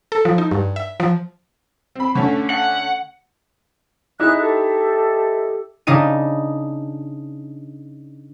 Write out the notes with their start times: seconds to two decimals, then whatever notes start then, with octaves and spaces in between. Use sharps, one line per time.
0.12 A4
0.25 F3
0.38 D#4
0.51 G2
0.76 E5
1.00 F3
1.95 C4 B5
2.15 D3 A3 C#4
2.50 F#5
4.20 D#4 E4 G#4 E5 F#6
4.40 G4 A4
5.87 C#3 D4 D#4 D#7